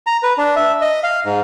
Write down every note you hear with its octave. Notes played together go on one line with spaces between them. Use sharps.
A#5
B4
D4
E5
D#5
F5
G#2